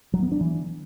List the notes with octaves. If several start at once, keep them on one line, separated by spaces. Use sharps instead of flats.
F#3
B3
D4
E3